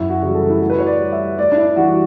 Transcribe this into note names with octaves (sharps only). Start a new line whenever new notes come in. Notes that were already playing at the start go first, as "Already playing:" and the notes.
Already playing: F#2 E4
F#4
C#3 E3 G3
A4
E4
A2 F#4
B4
C#5
D5
G3
E5
A2 D5
D4
E4
E3 G3 F#4